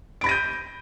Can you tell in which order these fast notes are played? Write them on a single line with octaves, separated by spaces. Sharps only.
D7 B5 A#6 D#7 G6